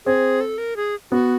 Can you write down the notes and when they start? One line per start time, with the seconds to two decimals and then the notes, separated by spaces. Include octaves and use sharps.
0.05 C4 G#4
0.41 A4
0.58 A#4
0.76 G#4
1.11 B3 F#4